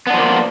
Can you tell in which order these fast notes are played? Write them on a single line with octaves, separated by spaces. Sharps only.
B3 D4 F3 A#3